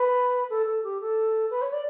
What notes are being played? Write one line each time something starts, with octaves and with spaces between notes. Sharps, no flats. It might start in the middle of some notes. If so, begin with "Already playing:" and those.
Already playing: B4
A4
A4
G4
A4
B4
C#5
D5